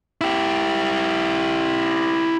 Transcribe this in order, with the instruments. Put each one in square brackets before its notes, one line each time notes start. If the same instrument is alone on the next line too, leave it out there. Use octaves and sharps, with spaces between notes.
[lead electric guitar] E4 G4